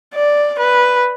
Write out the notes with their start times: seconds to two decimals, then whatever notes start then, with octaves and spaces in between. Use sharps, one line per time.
0.14 D5
0.59 B4